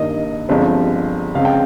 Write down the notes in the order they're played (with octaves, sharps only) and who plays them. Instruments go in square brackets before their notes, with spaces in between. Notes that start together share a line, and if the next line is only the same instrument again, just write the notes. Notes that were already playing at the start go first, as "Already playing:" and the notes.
Already playing: [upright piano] G2 D#3 A#3 D#5
G1 G2 F3 G#3 C4
C#2 C#3 G#3 C4 F5
G5